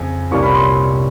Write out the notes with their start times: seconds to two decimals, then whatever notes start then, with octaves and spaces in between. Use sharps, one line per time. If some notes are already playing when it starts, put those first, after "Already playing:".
Already playing: F2 C#3 G#5
0.31 C2 A#2 G3 A#3 C#4 C#6
0.43 B5
0.55 C6